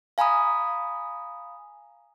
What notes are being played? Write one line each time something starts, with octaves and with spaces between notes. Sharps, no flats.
F5 G#5 A#5 B5 D#6